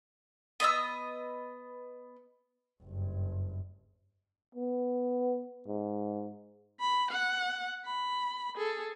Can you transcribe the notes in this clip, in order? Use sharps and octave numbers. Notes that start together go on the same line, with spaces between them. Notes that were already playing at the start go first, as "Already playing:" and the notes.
B3 D#5 C6 E6
F#1 G2
B3
G#2
B5
F#5
B5
G#4 A4